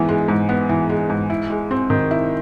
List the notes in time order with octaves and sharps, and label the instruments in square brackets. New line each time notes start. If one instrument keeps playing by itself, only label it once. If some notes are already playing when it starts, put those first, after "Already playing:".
Already playing: [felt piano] G#2 E3 B3
G#3
G#2
B3
E3
G#3
G#2
E4
G#3
C4
D#3
E4